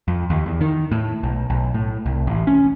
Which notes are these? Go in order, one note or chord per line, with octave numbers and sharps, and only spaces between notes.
F2
D#2
E2
D#3
A2
B1
B1
A2
C2
A1
C#4